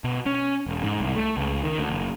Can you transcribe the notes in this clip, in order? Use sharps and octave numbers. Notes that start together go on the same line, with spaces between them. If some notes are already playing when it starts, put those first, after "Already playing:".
B2
C#4
E1
G#2
C2
A3
C#2
D#3
D2
F#1